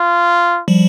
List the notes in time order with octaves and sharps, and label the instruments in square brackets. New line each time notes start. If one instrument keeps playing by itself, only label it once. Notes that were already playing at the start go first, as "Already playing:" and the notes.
Already playing: [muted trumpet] F4
[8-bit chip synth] F3 G3